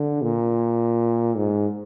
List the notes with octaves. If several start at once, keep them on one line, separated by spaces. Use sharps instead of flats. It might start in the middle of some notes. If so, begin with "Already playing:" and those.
Already playing: D3
A#2
G#2